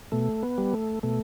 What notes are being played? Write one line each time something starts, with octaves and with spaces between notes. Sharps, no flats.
B2 A3
B3
G3
A3
B2 A3